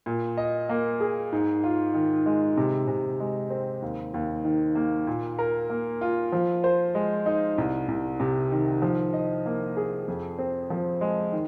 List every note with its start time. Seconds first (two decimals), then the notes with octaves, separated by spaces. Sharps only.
0.06 A#2
0.37 D#5
0.69 A#3
1.00 G#4
1.32 G#2
1.64 F4
1.94 D#3
2.26 G#3
2.57 C3
2.88 C3
3.20 G#3
3.50 C4
3.82 D#2
4.14 D#2
4.44 D#3
4.75 A#3
5.07 A#2
5.39 A#4
5.70 A#3
6.01 F4
6.32 F3
6.64 C5
6.95 G#3
7.26 D#4
7.58 C2
7.88 C2
8.20 C3
8.52 D#3
8.82 F3
9.13 D#5
9.46 A#3
9.77 G#4
10.08 F2
10.39 C4
10.70 F3
11.01 G#3
11.32 D#3